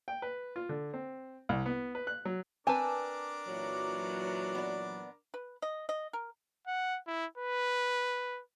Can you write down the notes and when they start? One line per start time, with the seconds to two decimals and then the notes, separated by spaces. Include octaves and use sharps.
0.08 G5
0.22 B4
0.56 F4
0.69 D3
0.94 C4
1.49 C2
1.66 B3
1.95 B4
2.07 F#6
2.25 F#3
2.67 C4 D4 A#4 B4 G#5 A5 D6
3.48 A#2 E3 F#3
4.55 B3 D5
5.34 B4
5.62 D#5
5.89 D#5
6.13 A#4
6.67 F#5
7.07 E4
7.38 B4